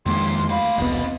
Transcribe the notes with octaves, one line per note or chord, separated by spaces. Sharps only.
F2 D#3 G#3 A#3 C6
A3 F5 B5
E1 C2 B3 C4 D#5